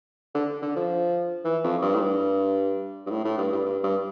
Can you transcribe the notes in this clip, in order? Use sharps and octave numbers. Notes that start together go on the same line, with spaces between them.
D3
D3
F3
E3
F2
G2
A2
G2
G2
A2
A2
G2
G2
G2
G2